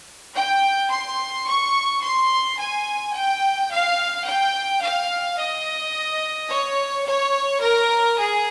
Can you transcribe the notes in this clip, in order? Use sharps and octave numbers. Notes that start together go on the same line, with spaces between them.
G5
C6
C#6
C6
G#5
G5
F5
G5
F5
D#5
C#5
C#5
A#4
G#4